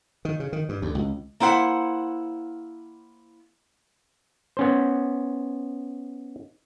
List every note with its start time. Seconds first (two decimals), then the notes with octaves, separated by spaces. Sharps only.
0.25 D#3
0.40 C#3
0.53 D#3
0.69 G2
0.82 D2
0.95 C#2
1.40 A#3 E4 C5 F#5
4.57 B3 C#4 C5